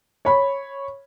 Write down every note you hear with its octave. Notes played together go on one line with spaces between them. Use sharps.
C#5 B5